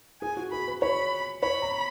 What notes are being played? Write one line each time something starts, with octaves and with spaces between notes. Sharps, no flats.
G#4 G#5
F#4
G#4 B5
B4
C#5 B5
C#5 B5
A#5